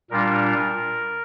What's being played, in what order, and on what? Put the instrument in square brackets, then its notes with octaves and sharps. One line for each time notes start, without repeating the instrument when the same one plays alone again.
[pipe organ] A#2 G3 D4 F4 A#4